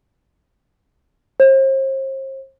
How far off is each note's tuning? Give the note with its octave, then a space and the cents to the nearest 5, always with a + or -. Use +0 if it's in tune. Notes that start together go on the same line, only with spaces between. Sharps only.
C5 +40